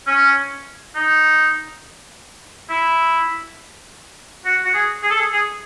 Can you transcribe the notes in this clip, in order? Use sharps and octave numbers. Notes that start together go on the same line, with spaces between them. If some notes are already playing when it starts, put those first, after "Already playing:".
C#4
D#4
E4
F#4
F#4
G#4
G#4
A4
G#4
G#4